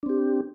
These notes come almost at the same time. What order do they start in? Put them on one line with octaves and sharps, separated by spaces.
D4 C4 G4